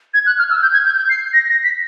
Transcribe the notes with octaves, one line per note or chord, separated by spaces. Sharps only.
G#6
F#6
F6
E6
G6
G#6
G6
G6
C7
A#6
A#6
B6